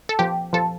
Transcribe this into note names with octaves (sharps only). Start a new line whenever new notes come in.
A4
F3 G4
F3 A4